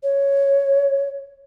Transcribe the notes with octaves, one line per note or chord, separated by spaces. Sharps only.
C#5